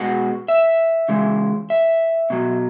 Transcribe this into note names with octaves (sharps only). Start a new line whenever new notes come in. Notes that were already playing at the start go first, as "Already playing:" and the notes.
Already playing: B2 G#3 F#5
E5
C#3 E3 G#3
E5
B2 F#3